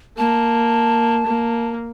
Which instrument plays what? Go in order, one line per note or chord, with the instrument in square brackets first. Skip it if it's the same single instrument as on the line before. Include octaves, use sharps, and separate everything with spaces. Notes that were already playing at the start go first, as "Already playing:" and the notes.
[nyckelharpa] A#3 [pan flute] A5
[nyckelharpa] A#3